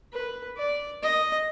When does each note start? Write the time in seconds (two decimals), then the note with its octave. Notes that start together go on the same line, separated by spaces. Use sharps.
0.13 B4
0.57 D5
1.02 D#5